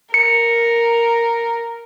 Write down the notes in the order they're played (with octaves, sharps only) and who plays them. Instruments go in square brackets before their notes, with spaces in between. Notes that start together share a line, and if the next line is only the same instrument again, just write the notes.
[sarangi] A#4 [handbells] C#7